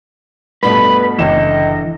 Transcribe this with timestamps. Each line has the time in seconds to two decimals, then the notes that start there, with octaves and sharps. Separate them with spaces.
0.63 G2 B2 A3 B4 B5
1.19 F#1 C#2 D3 E3 D#5 E7